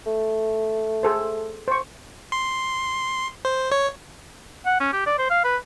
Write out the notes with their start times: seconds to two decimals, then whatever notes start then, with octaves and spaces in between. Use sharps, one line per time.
0.06 A3
1.03 G#4 A4 C5
1.68 C5 C#6
2.32 C6
3.45 C5
3.72 C#5
4.66 F#5
4.80 C#4
4.93 G4
5.06 D5
5.19 C5
5.30 F5
5.45 B4